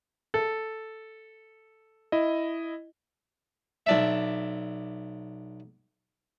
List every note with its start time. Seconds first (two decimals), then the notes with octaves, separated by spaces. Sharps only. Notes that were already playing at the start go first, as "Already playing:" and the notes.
0.34 A4
2.12 E4 D#5
3.86 B1 D4 E5